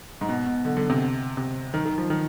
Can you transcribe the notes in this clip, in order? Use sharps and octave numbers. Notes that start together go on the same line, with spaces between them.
G#2
B2
B2
D3
D3
C3
C3
D#3
D#3
F3
D#3